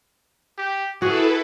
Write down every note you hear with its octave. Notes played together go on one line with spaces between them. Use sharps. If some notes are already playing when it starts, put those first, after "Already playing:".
G4
E4 F#4 G#4 A4 B4